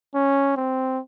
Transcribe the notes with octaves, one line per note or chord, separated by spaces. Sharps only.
C#4
C4